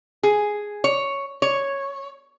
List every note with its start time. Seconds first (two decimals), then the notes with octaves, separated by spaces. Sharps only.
0.23 G#4
0.84 C#5
1.42 C#5